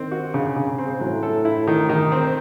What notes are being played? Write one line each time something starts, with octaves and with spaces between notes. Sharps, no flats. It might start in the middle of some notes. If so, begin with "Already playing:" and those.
Already playing: D#3 C4
F#4
C#3
C#3
C4
A2 F#3
A4
E4
D#3
D#3
C4